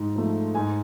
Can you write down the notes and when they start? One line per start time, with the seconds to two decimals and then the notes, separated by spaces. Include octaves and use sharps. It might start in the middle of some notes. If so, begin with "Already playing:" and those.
Already playing: G#2
0.16 F3 A3
0.55 G#2 G#5